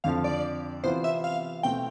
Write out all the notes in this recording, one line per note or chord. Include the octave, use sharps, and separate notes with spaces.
F2 D3 F3 F5
D5
C3 E3 B3 F4 C5
E5
F5
B2 A3 C4 G5